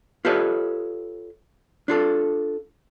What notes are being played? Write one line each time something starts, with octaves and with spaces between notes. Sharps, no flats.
F4 G4 A4 B4 C#5 D#5
D4 F4 A4